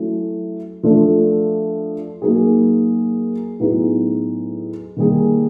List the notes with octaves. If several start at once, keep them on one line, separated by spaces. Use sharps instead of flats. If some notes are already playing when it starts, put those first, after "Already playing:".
Already playing: F#3 A3 C#4 E4
F3 A3 D4 F4
F#3 A#3 D#4 G#4
A2 F#3 B3 D#4 G#4
D#3 G3 A#3 D#4 G#4